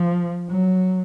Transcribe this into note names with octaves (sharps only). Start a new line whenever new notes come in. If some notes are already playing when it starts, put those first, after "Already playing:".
Already playing: F3
F#3